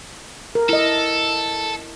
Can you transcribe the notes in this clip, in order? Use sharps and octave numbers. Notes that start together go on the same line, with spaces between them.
A#4
E4 A4 D#5